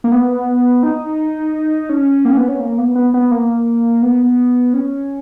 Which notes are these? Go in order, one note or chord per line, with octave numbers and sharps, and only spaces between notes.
A#3
B3
D#4
C#4
A#3
C#4
B3
C#4
A#3
B3
B3
B3
A#3
B3
C#4